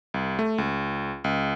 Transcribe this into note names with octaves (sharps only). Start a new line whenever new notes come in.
C2
A3
C#2
C#2